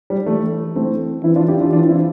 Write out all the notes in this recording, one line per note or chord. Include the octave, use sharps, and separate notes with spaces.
G3
E3 A3
A3 C4
E3 C4 E4
D4 F4
E4 G4
D4 F4
E3 D4 F4
C4 E4